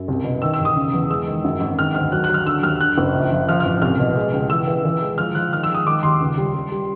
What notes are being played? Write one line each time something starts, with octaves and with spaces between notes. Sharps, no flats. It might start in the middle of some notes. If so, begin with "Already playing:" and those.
Already playing: F#2
C2
B2
D#3 E6
E6
E1
D#6
C#3
E2
G#3 E6
D#3
F#2
G#1
D#3 F6
D2 F6
F#3 F#6
F#6
F#3 F6
D3 E6
D#2 F6
D3 F#6
F#1
A#1
F3
F3 F6
A1 F6
C2 F6
B2
G#3
C#2
E3 E6
E3
E3
G#3
F3 F6
F3 F#6
D#3 F6
E6
G#3
D#6
D#3 D6
D#2 C6
C#2
G3
G3
G3